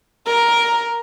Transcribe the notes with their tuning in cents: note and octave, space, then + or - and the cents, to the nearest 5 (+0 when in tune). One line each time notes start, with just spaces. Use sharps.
A#4 +5